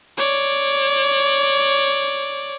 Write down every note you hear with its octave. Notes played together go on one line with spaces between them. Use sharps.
C#5 D5